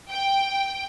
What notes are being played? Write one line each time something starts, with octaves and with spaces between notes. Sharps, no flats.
G5